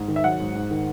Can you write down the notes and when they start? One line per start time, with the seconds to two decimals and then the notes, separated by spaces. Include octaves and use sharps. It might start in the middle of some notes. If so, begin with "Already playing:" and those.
Already playing: G#2
0.08 D#3
0.16 E5
0.24 F#3 F#5
0.40 G#2
0.55 G#2
0.71 D#3